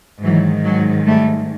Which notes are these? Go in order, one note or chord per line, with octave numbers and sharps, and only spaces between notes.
G#2 D#3 E3 F#3
F#3 G#3
G3 A3